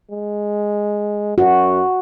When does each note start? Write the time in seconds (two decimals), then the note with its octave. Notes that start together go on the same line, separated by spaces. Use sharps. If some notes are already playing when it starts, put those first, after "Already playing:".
0.10 G#3
1.38 F#2 F#4